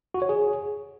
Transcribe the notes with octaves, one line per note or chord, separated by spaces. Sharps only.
F#4
C#5
G#4